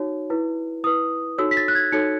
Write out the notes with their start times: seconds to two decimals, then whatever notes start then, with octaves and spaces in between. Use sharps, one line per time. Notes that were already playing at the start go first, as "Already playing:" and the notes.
Already playing: D#4 F#4 C#5
0.30 E4 B4
0.84 E4 B4 D#6
1.38 D#4 F#4 A4 C#5 E6
1.51 B6
1.57 A6
1.68 F#6
1.75 G#6
1.92 D#4 F#4 A4 C#5 C#7